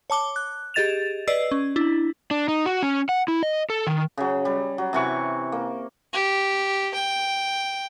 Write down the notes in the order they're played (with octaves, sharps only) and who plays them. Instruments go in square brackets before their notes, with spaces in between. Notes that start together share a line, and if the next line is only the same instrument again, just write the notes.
[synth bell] C#5 A5 D6 G7
F#6
G4 G#4 D#5 A6 E7 F7
B4 D5 D#5 E6 C7
C#4
D4 E4
[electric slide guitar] D4
D#4
F#4
C#4
F#5
E4
D#5
A4
D#3
[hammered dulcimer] C#3 F#3
G3
F#3
C3 E3 C#6
A#3
[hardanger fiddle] G4
G5